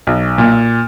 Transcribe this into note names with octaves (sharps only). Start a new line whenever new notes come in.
B1
A#2